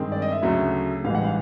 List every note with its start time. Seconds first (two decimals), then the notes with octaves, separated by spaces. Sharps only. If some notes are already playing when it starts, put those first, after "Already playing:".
Already playing: G2 D#3 G#3 C4
0.12 D5
0.22 D#5
0.32 E5
0.42 D2 C#3 F#3 A3
1.04 A1 G#2 E3 G3 F5
1.15 F#5
1.25 F5